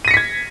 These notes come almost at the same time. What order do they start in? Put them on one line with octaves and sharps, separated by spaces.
D#7 A#6 C#7 B6 G#6